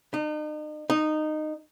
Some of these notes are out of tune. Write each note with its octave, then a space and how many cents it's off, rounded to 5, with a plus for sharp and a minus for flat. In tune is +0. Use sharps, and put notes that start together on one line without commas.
D#4 -40
D#4 -15